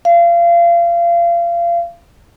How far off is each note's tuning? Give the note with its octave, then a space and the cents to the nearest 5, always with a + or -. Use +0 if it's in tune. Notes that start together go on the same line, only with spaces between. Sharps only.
F5 -30